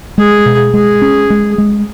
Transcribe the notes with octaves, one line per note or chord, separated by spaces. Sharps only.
G#3 G#4
B2
G#3 G#4
C#4
G#3
G#3